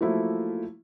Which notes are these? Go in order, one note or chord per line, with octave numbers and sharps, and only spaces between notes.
F3 F#3 A3 A#3 E4